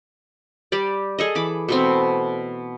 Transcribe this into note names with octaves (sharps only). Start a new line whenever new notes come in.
G3 G4 D5
G#4 A4 D#5
E3 B5 D6
B2 A3 C4